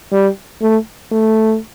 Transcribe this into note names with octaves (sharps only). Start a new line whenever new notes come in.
G3
A3
A3